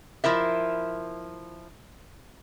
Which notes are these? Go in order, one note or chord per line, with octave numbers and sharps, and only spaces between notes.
F3 E4 A#4 E5